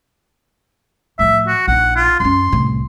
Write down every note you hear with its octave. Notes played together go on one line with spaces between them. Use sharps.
A2 F3 E5
F#4
A#1 D#4 F#5
F4
F#2 C#4 C6
C2 A2